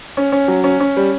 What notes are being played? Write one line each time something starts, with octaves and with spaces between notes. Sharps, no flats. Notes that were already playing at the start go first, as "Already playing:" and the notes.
C#4
C#4
F#3
C#4
C#4
G3